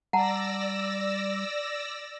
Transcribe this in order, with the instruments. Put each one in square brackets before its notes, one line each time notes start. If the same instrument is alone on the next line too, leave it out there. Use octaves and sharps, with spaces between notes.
[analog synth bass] G3 [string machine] D5 E6 A#6 [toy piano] F#5 A5 A#5